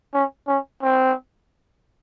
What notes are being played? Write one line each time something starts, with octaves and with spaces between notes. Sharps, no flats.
C#4
C#4
C4